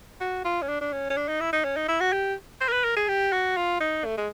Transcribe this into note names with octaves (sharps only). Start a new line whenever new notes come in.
F#4
F4
C#4
D4
D4
C#4
C#4
D4
D#4
E4
D#4
C#4
D#4
E4
F#4
G4
C5
A#4
B4
A#4
G#4
G4
F#4
F4
D#4
A3
G#3